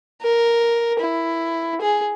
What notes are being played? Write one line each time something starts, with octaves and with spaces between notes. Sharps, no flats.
A#4
E4
G#4